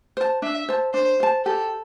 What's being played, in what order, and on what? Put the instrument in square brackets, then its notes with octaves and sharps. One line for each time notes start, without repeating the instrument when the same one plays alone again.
[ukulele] C5 A5
[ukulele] D4 [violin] E5
[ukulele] C5 A5
[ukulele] D4 [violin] C5
[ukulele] C5 A5
[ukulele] G4 [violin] A4